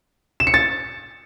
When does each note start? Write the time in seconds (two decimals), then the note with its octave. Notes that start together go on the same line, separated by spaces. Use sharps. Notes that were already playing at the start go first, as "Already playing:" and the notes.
0.40 E7
0.47 C#7
0.54 A6